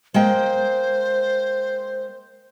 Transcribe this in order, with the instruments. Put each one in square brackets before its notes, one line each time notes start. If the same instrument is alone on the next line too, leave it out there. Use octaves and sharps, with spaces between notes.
[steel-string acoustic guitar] G#3 A#3 G5 [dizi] C5